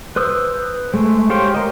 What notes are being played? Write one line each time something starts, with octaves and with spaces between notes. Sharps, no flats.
B4 C5 D#6 E6
G#3 A3
G4 C5 C#5 F5 G5
A#4 D#5